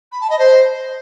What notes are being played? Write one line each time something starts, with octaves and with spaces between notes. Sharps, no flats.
B5
A5
D#5
C5